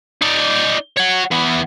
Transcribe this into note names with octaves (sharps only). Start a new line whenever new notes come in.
D#4 D5
C#5 F#5
E3 B3